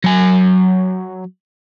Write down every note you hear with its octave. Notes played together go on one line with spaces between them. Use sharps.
F#3 G#5